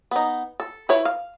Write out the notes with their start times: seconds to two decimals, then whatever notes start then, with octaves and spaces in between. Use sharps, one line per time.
0.11 B3 D#4
0.60 A4
0.89 E4 A4 B4 C#5
1.05 F5